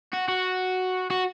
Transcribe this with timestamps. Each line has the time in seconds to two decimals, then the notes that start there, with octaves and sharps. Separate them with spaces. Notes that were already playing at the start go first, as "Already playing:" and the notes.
0.13 F#4
0.28 F#4
1.10 F#4